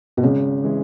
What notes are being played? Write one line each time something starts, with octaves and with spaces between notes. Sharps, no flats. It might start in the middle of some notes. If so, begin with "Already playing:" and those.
B2
G#1 C#3
E3 G#3